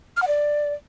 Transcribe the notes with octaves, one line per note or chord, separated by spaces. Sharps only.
F6
F#5
D5